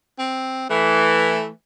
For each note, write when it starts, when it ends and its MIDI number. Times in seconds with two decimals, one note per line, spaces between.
0.19 0.68 60
0.70 1.48 52
0.70 1.49 57